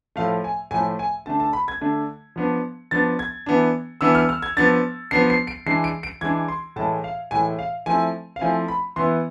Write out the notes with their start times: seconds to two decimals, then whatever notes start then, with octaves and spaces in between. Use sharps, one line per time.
0.16 A2 F3 A3 F5
0.44 G#5
0.71 A2 F3 A3 G#5
0.99 G#5
1.26 D3 A3 D4 A5
1.40 A5
1.53 B5
1.68 G#6
1.81 D3 A3 D4
2.36 F3 B3 D4
2.91 F3 B3 D4 A6
3.19 G#6
3.46 E3 B3 D4
4.01 E3 B3 D4 E6
4.15 F6
4.29 F6
4.42 G#6
4.57 F3 B3 D4 A6
5.11 F3 B3 D4 C7
5.30 C7
5.47 D7
5.66 E3 G#3 D4 C7
5.84 D7
6.03 D7
6.21 E3 G#3 D4 G#6
6.48 C6
6.76 A2 E3 G#3 A5
7.04 F5
7.31 A2 E3 G#3 G#5
7.59 F5
7.86 F3 A3 C4 E4 G#5
8.36 F5
8.41 F3 A3 C4 E4 G#5
8.68 B5
8.96 E3 B3 E4 C6